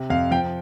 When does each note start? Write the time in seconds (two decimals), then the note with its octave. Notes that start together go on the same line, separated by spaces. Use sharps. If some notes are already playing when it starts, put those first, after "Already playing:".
Already playing: C3
0.10 F2 F5
0.31 F3 G5